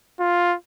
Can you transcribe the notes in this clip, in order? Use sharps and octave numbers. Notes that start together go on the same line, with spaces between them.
F4